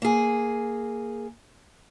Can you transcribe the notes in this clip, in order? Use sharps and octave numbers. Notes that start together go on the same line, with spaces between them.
A#3 G#4